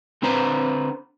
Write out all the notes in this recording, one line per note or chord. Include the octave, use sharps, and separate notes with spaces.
D3 C4 D4 B4 C5 A#5